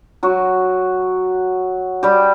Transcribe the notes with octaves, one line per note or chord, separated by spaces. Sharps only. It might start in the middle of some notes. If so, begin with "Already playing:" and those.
F#3 F#4
G3 G4